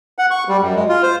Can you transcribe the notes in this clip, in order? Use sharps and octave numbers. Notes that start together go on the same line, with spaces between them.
F#5
C#6
G3
F#2
G#3
F4
C5